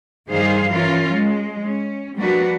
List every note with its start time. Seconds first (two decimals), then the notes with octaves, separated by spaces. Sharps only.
0.29 G2 D#3 G3 G#4 C5 F5
0.70 E3 C#4 F4 A#4
1.11 G#3
1.63 C#4
2.16 F3 G3 A#3 D4 F#4 B4